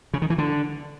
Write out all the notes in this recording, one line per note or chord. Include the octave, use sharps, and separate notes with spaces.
C#3
D#3
E3
D3